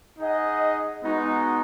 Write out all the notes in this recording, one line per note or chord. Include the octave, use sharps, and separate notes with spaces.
D#4 G#4 D#5 F#5
G#3 B3 D#4 F#4